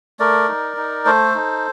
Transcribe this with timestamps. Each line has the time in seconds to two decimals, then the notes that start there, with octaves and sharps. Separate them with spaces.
0.19 A3 A#4 D5
0.48 D#4
0.77 D#4
1.06 A3 A4 C5
1.35 D#4